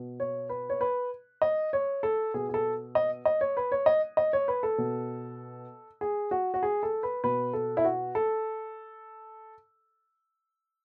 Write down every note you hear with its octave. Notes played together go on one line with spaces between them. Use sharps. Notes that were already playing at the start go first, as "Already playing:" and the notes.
Already playing: B2
C#5
B4
C#5
B4
D#5
C#5
A4
B2 G#4
G#4
A4
D#5
D#5
C#5
B4
C#5
D#5
D#5
C#5
B4
A4
B2
G#4
F#4
F#4
G#4
A4
B4
B2 B4
A4
E4
F#4
A4